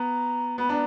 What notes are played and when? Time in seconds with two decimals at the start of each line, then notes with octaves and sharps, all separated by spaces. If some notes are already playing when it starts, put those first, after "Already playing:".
Already playing: B3 A#5
0.58 B3 B5
0.69 D4 A#5